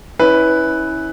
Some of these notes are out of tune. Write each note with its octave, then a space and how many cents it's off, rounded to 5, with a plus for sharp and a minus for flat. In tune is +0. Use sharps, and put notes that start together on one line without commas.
C#4 +0 E4 -30 B4 +0